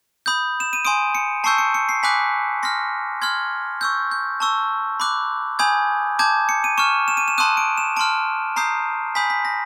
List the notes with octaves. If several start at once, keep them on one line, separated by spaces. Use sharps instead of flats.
B5 D#6 G6
E7
D#7
G#5 C6 D#6 D7
C#7
A5 C#6 E6 G6 C7
C#7
C#7
C7
G#5 B5 D6 F#6 B6
C6 F6 A#6
C6 F6 G#6
C#6 E6 G6
G6
A5 C#6 E6
B5 D6 F#6
G#5 B5 D#6 G6 G#6
A5 D6 G6 G#6
C#7
D#7
C#6 F6 E7
E7
D#7
E7
A5 C6 D#6 F#6 D#7
D7
E7
A5 C6 F6 D7
A#5 D#6 G6 C7
G#5 B5 D#6 G6 B6
B6
A#6